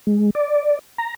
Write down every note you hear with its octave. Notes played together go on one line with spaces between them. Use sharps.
G#3
D5
A#5